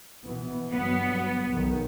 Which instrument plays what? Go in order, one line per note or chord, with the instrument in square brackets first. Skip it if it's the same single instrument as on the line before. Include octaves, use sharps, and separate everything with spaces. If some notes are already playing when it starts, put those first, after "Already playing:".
[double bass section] B2 E3 B3
[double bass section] G1 F#3 [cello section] B3
[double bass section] B1 D#3